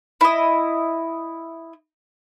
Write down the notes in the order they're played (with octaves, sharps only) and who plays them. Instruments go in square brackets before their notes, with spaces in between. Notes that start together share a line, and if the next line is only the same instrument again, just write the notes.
[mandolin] E4 D#5